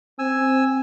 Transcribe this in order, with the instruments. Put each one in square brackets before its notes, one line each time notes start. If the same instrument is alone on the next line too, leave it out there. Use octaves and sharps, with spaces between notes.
[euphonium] C4 [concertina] G#5 E6